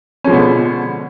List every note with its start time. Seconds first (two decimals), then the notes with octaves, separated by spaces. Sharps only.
0.24 C#4
0.27 F3
0.30 G#3
0.33 B2
0.35 D3